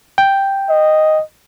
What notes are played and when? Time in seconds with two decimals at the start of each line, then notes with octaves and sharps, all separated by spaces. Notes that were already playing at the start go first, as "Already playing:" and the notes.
0.18 G5
0.69 D#5